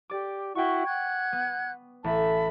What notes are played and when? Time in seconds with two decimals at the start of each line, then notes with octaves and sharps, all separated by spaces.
0.10 G4 D5 D6
0.55 E4 F#4 G5 C#6
0.86 F#5 F#6 G#6
1.33 B3
2.04 A1 E5 A5 B5